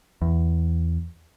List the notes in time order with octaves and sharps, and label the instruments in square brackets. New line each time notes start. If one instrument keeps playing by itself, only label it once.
[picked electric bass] E2